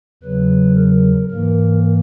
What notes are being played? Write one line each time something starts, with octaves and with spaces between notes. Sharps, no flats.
E2 C#3 F#3 B4
A#4
G#2 E3 A#3 A#4